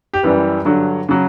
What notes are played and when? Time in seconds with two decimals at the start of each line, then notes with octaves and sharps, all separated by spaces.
0.13 G4
0.23 F#2 E3 G3 B4
0.65 G2 D3 F#3
1.09 C#3 F#3